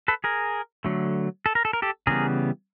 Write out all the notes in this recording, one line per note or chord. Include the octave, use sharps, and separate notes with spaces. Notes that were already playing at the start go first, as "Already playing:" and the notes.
A4 B4
G#4 A#4
D3 F#3 A3
A4
A#4
A4
A#4
G4 A4
C#3 E3 G3 B3 G#4 A#4